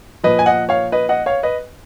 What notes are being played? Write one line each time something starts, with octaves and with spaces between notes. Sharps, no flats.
A#2 F3 B4 D#5
G#5
D#5 F#5
C#5 F5
B4 D#5
D#5 F#5
C#5 F5
B4 D#5